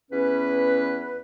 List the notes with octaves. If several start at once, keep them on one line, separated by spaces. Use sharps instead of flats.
E2 C#4 B4